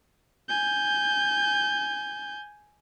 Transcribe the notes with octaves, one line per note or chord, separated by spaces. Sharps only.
G#5 G6